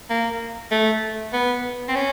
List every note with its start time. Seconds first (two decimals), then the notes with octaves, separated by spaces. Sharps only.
0.10 A#3
0.71 A3
1.33 B3
1.89 C4
1.95 C#4